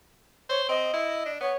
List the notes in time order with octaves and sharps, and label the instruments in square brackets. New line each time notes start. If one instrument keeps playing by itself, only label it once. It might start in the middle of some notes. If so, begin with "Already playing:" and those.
[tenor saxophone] C5 [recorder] C#5
[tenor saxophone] C4 [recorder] D#5
[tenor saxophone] E4
D4
[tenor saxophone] B3 [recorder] C#5